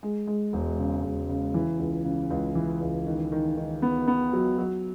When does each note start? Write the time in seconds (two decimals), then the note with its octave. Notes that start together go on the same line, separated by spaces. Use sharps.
0.03 G#3
0.27 G#3
0.53 E1
0.79 C#3
1.04 E1
1.29 C#3
1.54 E3
1.79 C#2
2.05 C#3
2.30 C#2
2.55 E3
2.81 C#2
3.06 D#3
3.32 D#3
3.57 D#3
3.82 B3
4.07 B3
4.33 F#3
4.58 F#3